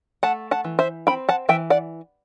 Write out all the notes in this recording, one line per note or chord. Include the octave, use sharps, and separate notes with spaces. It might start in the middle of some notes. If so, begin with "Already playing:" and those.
A3 F#5 A5
F#5 A5
E3
C5 E5
C4 G5 B5
F#5 A5
E3 E5 G5
D5 F#5